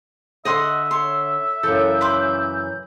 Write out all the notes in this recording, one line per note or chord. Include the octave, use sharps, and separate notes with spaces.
D3 D#5 E5 F#5 C6
C#5 C6
F#2 C#3 E3 A4 G6
B4 C6 D6